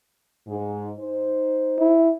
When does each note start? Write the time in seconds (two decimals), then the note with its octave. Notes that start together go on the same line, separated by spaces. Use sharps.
0.48 G#2
0.99 D#4 C5
1.79 E4